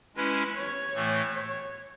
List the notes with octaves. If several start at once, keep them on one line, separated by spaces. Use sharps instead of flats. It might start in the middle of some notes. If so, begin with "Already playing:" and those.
G#3 C#4 E4 B4
C#5
A2 E3 A3
C#5